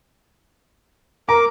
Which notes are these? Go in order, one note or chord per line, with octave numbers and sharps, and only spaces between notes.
A#4 A#5 D6